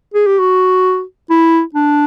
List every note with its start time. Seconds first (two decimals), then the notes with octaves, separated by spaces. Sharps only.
0.14 G#4
0.27 G4
0.39 F#4
1.30 E4
1.75 D4